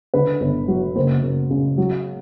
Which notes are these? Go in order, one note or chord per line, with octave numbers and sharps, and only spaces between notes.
D3 B4
G1
F#3
F#1 C5
F#1
C#3
F#3